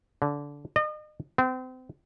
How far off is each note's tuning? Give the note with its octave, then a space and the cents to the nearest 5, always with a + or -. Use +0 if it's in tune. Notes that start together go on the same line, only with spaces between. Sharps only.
D3 -20
D#5 -40
C4 -35